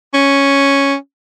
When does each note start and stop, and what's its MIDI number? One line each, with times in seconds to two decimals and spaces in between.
0.14 0.95 61